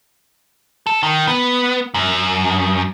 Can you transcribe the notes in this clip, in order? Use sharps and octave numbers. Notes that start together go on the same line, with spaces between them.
A4
D#3
B3
F#2